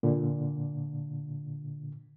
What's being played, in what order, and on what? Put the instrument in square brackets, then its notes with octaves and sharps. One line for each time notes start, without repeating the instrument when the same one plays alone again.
[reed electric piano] A#2 D3